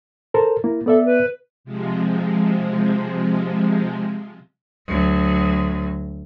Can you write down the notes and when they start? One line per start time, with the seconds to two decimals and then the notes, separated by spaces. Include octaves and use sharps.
0.34 A4 A#4 C5
0.64 A#3 E4
0.86 B3 A4 D5 E5
1.05 B4
1.64 C3 F3 G#3
4.87 D2 F#3